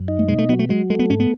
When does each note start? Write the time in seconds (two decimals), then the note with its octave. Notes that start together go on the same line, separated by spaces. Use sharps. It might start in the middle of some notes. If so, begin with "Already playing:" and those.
Already playing: F#2
0.08 D#4
0.19 A3
0.28 B2 G#3
0.38 A3
0.49 F#3 B3
0.59 A3
0.69 F#3 G#3
0.90 G#3 A3
0.99 B3
1.10 G#2 C#4
1.20 B3